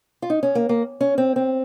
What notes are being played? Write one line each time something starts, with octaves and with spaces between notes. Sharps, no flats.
F4
D#4
C#4
A#3
A#3
C#4
C4
C4